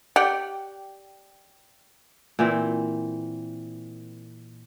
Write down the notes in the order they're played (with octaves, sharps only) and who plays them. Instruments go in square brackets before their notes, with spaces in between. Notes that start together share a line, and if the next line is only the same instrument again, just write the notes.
[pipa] G4 D5 F#5 G5
[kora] A#2 E3 C4